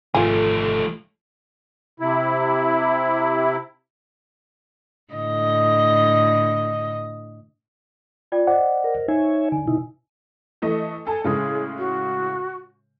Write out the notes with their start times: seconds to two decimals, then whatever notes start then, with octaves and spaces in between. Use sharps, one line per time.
0.14 G#1 F3 A3 F4 G#4 A4
2.00 C3 E4
5.13 A2 D3 D#5
8.32 F4 D5 G5
8.47 C5 D5 D#5 F#5
8.84 A#4
9.08 D#4 C#5 E5 G#5
9.52 D3 G#5
9.68 B2 D#4 E4
10.62 E3 A3 D#5
11.07 A4 G#5 A5
11.24 A2 C#3 G#3 G#4
11.78 F#4